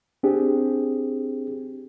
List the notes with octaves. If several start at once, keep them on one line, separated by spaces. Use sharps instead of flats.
C4 D4 G4 G#4